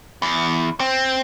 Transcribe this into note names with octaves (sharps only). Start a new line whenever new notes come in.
E2
C4